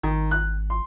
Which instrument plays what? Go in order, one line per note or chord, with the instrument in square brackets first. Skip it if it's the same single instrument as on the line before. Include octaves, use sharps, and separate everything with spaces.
[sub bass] G#1 [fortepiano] D#3
[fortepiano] F#6
C6